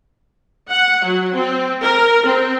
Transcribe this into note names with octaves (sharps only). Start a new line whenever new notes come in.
F#5
F#3
C4
A#4
C4